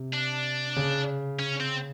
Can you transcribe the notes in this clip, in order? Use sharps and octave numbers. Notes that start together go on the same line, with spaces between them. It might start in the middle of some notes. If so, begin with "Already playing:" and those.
Already playing: C3
D4
C#3
C#4
C4